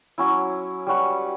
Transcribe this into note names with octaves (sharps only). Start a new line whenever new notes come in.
F#3 C#4 E4
G3 C#4 F#4 B4